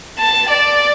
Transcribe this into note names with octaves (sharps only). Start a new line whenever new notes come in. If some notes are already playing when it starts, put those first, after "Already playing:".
A5
D5